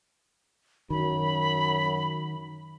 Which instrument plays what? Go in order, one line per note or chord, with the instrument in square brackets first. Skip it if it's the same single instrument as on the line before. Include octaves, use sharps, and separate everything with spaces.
[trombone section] F#2 [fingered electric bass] D#3 [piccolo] B5